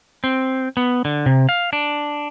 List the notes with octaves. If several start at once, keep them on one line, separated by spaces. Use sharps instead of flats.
C4
B3
D3
C3
F5
D4